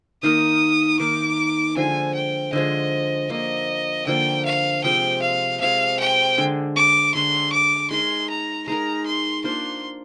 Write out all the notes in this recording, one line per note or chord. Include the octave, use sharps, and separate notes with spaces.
D#3 A#3 D#4 A#4 D#6
D#3 A#3 D#4 A#4 D6
D3 F3 G#3 G#5
G5
D3 F3 G#3 D#5
D3 F3 A#3 D#5
D3 F3 A#3 G5
F5
C3 F3 G#3 G5
F5
C3 F3 G#3 F5
G5
D3 G#3 D4
D6
D3 G#3 D4 C6
D6
G#3 D#4 A#4 C6
A#5
G#3 D#4 A#4 A#5
C6
A#3 D4 F4 C5 C6